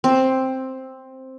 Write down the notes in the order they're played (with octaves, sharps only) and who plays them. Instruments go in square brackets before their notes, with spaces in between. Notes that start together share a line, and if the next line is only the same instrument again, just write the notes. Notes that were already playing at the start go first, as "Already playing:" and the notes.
[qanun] C4